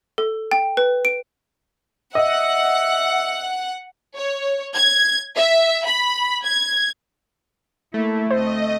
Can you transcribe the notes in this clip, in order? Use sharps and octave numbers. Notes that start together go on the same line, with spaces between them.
A4
G5
B4
D7
D#5 E5 F#5
C#5
G#6
E5
B5
G#6
A3 A#3 E4
D2 C4 C5 D#5